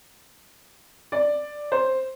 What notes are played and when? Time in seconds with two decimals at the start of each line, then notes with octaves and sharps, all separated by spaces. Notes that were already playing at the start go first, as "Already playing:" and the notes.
1.12 D5
1.72 C5